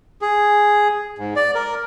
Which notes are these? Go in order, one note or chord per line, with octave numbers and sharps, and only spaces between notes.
G#4
G#2
D5
A#4